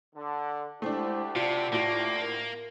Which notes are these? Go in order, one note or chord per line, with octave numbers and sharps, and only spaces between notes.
D3
D2 D3 G#3 A3 D4 E4 G4 C5
C3 F4 D5 A5
A2 A#3 F4 C7
A#4